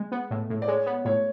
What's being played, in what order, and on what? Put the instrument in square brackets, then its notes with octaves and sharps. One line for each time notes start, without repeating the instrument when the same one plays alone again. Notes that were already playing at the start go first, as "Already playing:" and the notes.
Already playing: [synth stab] G#3
B3
A2
A2
[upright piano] D5
[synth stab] G#3 [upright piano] C#5
[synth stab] B3
[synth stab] A2 [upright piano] C#5